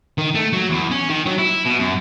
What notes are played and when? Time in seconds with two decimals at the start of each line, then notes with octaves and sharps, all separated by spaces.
0.18 D#3
0.35 A3
0.53 F#3
0.70 E2
0.91 C#4
1.09 D#3
1.26 F#3
1.39 E4
1.66 B2
1.79 F#2